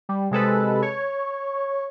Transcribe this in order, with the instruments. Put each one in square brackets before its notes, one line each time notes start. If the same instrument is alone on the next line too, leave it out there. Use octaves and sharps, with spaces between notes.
[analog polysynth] G3
C3 G#3 A4 B4
C#5